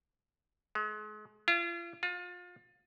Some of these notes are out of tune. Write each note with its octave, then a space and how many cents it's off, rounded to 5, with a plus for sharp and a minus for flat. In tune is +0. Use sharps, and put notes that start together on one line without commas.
G#3 +35
F4 -40
F4 +30